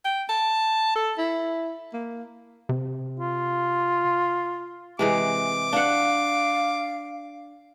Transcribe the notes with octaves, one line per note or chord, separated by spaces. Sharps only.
G5
A5
A4
E4
A#3
C3
F4
C3 E3 G#3 D6
D4 F5 F#5